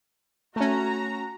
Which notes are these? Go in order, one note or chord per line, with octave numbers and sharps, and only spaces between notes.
A3 C#4 F#4 A#5